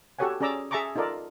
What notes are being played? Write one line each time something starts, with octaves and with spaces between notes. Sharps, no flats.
F#4 G4 A4 C#5 F#5 G#5
C#4 G#4 D5 A#5 D6 E6
G#4 E5 A5 A#5 C#6 D6
D#4 F4 A4 A#4 D5